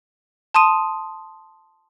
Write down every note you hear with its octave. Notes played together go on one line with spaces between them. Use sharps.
A5 C6 D#6 D#7